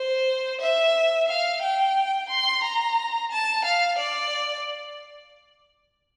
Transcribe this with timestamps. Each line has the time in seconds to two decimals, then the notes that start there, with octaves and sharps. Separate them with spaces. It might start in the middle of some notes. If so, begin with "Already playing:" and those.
Already playing: C5
0.61 E5
1.29 F5
1.63 G5
2.29 C6
2.64 A#5
3.31 A5
3.65 F5
3.99 D5